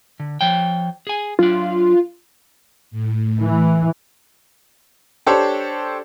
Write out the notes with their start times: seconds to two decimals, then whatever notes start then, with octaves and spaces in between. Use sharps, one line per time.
0.20 D3
0.41 F3 C#5 G5
1.07 G#4 G#5
1.39 F#3 D4 F4
2.91 A2
3.41 E3
5.26 D4 G4 A4 C5 C#5